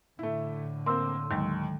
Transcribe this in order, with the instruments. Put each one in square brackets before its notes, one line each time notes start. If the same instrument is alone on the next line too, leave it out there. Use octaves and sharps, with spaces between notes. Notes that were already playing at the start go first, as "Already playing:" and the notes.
[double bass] A2 D3 [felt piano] A3 E4
[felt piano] A#3 C4 [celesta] C6 E6
[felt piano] D#2 [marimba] D#3 F#3 G#3